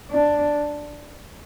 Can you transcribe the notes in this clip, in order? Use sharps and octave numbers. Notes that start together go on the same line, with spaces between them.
D4